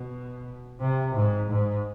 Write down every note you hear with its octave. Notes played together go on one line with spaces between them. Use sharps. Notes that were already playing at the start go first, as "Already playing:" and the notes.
Already playing: B2
C3
G#2
G#2